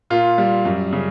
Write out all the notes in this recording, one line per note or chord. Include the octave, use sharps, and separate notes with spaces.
A#2 F4
G3
F#2
C#3